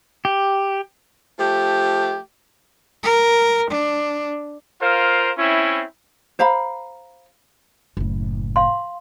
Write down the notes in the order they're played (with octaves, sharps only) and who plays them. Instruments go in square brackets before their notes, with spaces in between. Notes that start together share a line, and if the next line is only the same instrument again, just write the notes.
[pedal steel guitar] G4
[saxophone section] F3 A3 G4
[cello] A#4
D4
[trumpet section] F4 A#4 C5 F5
C4 C#4 E4
[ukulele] C5 F5 A#5 B5
[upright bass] F#1 A2
[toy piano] F5 C6